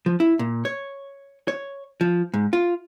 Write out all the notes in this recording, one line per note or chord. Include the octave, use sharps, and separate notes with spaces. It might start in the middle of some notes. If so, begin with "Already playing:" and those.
F3
E4
A#2
C#5
C#5
F3
G#2
F4